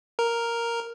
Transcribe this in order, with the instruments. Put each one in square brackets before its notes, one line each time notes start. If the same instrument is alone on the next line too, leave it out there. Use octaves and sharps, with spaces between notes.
[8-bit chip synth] A#4